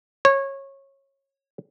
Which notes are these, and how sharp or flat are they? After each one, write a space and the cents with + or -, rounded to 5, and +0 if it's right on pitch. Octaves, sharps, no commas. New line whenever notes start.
C#5 -20